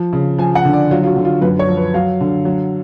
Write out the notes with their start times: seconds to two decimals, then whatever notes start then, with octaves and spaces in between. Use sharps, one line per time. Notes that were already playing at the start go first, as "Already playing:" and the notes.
Already playing: F3
0.13 C#3
0.38 F3 G#5
0.55 F#5
0.65 D3
0.73 D5
0.91 F#3 F4
1.03 F4
1.07 F#4
1.16 D3
1.25 F4
1.42 F#2 B4
1.59 C#5
1.68 F3
1.77 B4
1.94 F#3 F5
2.21 D3
2.45 F#3